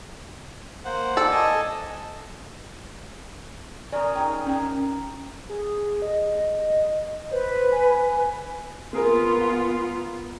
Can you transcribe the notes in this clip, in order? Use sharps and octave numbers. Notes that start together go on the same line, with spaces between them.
A#3 C5 F#5
A4 D5
D#5 G#5 A5
C#4 A#4 D5 D#6
D#4 G#4 A#4 G5
C#4 G5
G#4
D#5
B4 C5
G#5
A#3 B3 F4 G#4 A#4